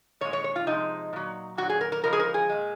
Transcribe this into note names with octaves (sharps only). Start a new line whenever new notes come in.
A#2 G#3 C#5
C#5
C#5
F4
C3 F3 G#3 D#4
A#2 F#3
A#2 F#3 F#4
G#4
A#4
A#4
C#3 F3 G#3 A#4
G#4
A#4
G#4
A#2 G#3